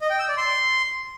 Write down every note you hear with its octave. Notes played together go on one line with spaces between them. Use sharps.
D#5
G5
E6
D5
C6